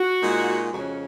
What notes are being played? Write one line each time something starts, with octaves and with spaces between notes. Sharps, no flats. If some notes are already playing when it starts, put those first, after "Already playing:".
Already playing: F#4
A#2 G#3 D#4
F2 C#3 G#3 C#4 F#4